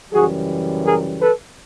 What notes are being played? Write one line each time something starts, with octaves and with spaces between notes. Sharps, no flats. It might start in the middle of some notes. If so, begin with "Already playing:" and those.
F#2 C#3 E3 G3 F#4 G#4
G#4 A#4
A4 B4